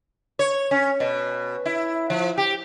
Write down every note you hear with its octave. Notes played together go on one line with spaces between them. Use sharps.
C#5
C#4
B2
E4
F3
G4